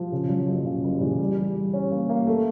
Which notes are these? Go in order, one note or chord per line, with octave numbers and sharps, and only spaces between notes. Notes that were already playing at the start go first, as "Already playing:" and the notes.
Already playing: F3
C#3
F#3
F#1
C#3
F#1
E2
G3
G3
G3
C#4
A#3
A#3
A3